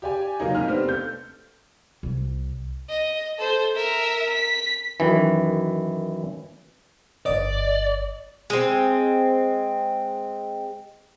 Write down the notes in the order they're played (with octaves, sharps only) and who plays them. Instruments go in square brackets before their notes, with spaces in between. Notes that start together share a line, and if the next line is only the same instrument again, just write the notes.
[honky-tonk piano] G4 D5 G#5
C#3 F#3 A#3 C#4 D#4
F2 G#2 D#4 F6
C3 A3 B3 C4 D4
A4 G6
[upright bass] C2
[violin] D#5
A4 C5
A#4 E5
B6
[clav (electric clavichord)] F#2 D#3 E3
[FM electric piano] G1 D#5 [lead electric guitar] D5
[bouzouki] G#3 C4